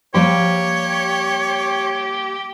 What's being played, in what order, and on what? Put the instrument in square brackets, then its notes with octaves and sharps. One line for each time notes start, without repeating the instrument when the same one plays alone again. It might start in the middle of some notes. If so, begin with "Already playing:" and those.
[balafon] F3 [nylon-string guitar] G3 A#3 G5 [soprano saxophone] G4 [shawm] C#5